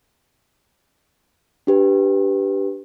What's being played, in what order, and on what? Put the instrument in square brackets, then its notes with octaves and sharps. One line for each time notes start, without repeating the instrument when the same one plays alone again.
[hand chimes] D4 G4 B4